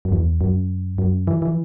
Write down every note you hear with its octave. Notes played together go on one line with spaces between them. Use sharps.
F#2
E2
F#2
F#2
E3
E3